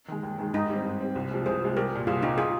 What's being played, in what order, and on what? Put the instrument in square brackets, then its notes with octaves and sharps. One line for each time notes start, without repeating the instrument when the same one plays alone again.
[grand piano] D#3 G#3
D#2
D#3 G#3
[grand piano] G#2 [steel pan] D#4
[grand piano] G3 C4
G#2
G3 C4
C2
C3 F3 G#3
[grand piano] C2 [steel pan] G#4 C5
[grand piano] C3 F3 G#3
[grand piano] C2 [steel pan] G4 A#4
[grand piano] A#2 G3
[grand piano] C2 [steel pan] F4 G#4
[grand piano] A#2 G3 [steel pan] D#4 G4
[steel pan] F4 G#4